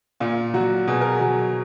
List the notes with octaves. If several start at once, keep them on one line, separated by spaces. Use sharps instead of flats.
A#2 F4
F#3 F#4
B2 G#4
A#4
G#4
F#3